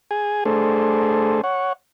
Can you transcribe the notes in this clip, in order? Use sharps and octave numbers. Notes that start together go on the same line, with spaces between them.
G#4 G#5
A3 D4 G#4 A4 C5
C#5 F#5